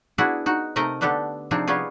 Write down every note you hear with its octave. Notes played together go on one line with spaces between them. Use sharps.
B3 D4 E4 F#4 G#4
D#4 F#4
C3 A3 D#4 A#4 D#5 A#5
D3 B3 D4 G4 A4
C3 F3 C4 D4 D#4 G#4
G3 B3 C#4 F4 G#4